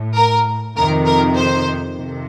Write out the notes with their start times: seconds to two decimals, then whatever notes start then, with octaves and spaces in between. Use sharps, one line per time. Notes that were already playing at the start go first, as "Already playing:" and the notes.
Already playing: A2
0.16 A#4
0.76 F2 C3 D#3 A#4
1.07 A#4
1.36 C5
1.96 F2 C3 D#3